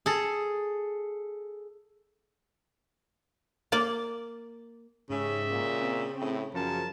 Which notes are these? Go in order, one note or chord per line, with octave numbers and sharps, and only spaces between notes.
G#4 A4
A#3 D5
G#2 C#3 C#4 G4 E5
A#2
C4
A2
F#2 C#3 F3 A#4 A5